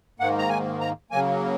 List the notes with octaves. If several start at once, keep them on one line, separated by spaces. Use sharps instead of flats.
G#2 D#3 A#3 F#5
A#5
G#5
A#5
C#3 F#3 A#3 G#5